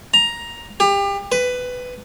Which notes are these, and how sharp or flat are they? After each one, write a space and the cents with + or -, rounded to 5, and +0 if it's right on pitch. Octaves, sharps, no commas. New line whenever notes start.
A#5 +10
G4 +30
B4 +15